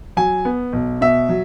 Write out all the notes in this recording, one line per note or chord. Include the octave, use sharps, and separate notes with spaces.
F#3 G#5
B3
B1
B2 E5
F#3